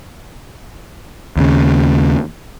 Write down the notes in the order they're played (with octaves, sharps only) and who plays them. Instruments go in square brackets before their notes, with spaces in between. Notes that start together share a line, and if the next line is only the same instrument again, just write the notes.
[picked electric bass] D#2 C#3